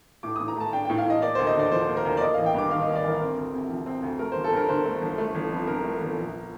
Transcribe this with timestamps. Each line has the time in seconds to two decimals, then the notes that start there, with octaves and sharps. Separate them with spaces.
0.23 A2 D6
0.36 A2 D#6
0.48 A#5
0.56 A3 A5
0.73 D4 G5
0.85 A2 G5
0.98 F5
1.06 A2 D#5
1.22 A#3 D5
1.35 D2 C5
1.47 D#5
1.55 D3 D5
1.72 F3 C5
1.88 A#3
1.97 A#4
2.05 D2 C5
2.17 D5
2.21 A#3 D#5
2.34 A1 F5
2.46 G5
2.54 G2 D6
2.71 D#3 F5
2.83 A#3 D#5
2.95 D5
3.04 A1 A#4
3.20 C4
3.37 D2
3.53 C3
3.70 F3
3.86 C4
4.03 D2
4.19 A3 A#4
4.32 G1 C5
4.44 A4
4.53 G2 A#4
4.69 D3 C5
4.86 A3
5.02 G1
5.18 A3
5.35 G1
5.51 F2
5.68 D3 A#4
5.85 A3
6.01 G1
6.18 A#1